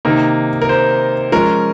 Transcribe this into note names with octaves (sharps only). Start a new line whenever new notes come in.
C3 D#3 A#3 D#4
A#4
C5
F3 G#3 C#4 A#4